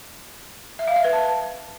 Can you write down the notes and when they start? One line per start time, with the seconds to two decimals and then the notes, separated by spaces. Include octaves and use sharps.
0.79 E5
0.88 F5
0.96 E5
1.04 B4
1.13 A5